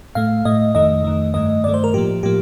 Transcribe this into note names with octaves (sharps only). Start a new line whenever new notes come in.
A2 A3 F5
A2 A3 D#5
F2 D#3 A3 D#5
F2 D#3 A3
G2 D#3 A3 D#5
G2 D#3 A3 D5
C5
A#4
A2 F3 A#3 G4
A2 F3 A#3 G4